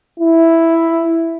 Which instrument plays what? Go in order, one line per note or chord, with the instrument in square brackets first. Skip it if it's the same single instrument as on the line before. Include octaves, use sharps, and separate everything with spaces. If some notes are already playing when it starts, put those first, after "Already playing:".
[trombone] E4